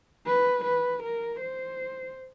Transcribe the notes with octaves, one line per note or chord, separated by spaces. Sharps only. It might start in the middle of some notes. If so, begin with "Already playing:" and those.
B4
B4
A#4
C5